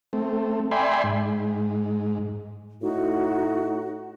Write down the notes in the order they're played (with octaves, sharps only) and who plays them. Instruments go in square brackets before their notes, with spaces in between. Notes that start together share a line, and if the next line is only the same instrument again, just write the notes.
[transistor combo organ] A3 C4
D5 E5 G5 G#5 B5 C6
G#2
[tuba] A2 [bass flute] D#4 [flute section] F#4